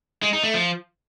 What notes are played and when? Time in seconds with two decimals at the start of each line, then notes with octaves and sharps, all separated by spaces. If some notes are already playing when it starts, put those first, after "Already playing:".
0.22 G#3
0.33 D#4
0.43 A3
0.54 F3